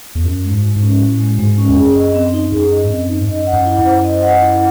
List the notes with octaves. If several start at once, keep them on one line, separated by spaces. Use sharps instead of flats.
E2
F#2 F#4
G#3
G#2
G#3
G#2
C#4
A2 F#4
G#3
G#2 G#3
C#4
E2
F#2 G#4
D#5
C4
D#4
F#2 G#4
D#5
G#2
F#2 C4
D#4
G#2
F#2 D#5
F#5
F#2
E4
F#2
C5
D#5
F#5
E4